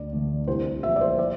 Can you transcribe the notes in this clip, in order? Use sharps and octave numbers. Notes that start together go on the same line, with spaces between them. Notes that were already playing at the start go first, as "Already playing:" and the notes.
Already playing: D2 D5
D3 A3
C2 C5
A#2 F3 E5
D5
C5
D5